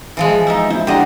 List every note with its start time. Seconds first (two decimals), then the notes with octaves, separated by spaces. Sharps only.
0.17 E3 F3 G#3
0.47 D#4 D#5 E5
0.70 E4 C5
0.87 D3 G4 C5 D5 D#5 F#5 A#5